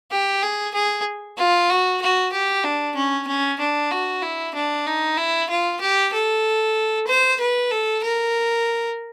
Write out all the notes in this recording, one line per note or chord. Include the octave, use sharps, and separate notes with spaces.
G4
G#4
G#4
F4
F#4
F#4
G4
D4
C#4
C#4
D4
F#4
E4
D4
D#4
E4
F4
G4
A4
C5
B4
A4
A#4